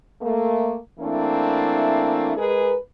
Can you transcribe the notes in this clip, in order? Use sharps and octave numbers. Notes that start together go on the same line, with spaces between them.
A3 A#3
E3 A3 A#3 C4 D4 E4
G#3 G#4 A#4 B4